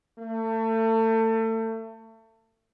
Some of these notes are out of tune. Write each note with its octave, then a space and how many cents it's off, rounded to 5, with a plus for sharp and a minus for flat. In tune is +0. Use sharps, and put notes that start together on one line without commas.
A3 +30